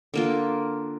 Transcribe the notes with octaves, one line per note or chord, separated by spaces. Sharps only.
D3 A#3 F4